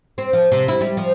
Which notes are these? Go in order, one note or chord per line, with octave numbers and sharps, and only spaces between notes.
C4
F3
C3
E4
G3
F3